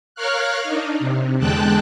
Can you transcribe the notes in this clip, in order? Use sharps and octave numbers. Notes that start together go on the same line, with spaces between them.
A#4 C#5 F5 F6 F#6
D4 D#4
C3
E2 D3 G#3 G5 A5 F#6